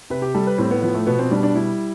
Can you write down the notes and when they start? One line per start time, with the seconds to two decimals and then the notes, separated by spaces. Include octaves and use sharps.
0.10 C3 B4
0.22 G4
0.34 G3 A4
0.47 B4
0.58 A2 C4
0.71 B3
0.82 F3 B3
0.95 A3
1.07 B2 B3
1.19 C4
1.31 G3 D4
1.43 D4
1.55 G3 E4